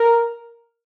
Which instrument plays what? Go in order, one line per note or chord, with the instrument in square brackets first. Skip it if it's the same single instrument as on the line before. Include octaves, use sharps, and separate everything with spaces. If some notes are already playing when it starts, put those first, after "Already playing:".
Already playing: [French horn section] A#4